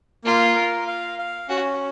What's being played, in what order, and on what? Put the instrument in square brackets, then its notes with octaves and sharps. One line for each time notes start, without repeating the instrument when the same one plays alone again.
[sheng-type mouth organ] A#3 [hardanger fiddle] F4
[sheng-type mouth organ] A#4
F5
F5
[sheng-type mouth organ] C#4 [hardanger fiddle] F#4